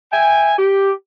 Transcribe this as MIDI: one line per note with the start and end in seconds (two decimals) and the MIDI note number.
0.12 0.53 76
0.12 0.53 79
0.12 0.53 80
0.58 0.91 67